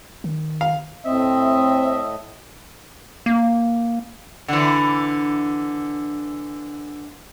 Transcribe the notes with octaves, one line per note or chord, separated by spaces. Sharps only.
D#3
F5
A2 C4 D#5 E5
A#3
D3 E3